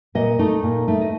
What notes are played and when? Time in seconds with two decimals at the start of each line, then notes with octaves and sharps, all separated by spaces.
0.15 A#2 D#5
0.39 A3 D#4
0.63 A#2
0.88 A3 D#4
1.01 D#5